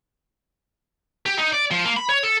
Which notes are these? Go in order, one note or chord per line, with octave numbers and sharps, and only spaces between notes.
G4
D#4
D5
F3
A#3
B5
C#5
A4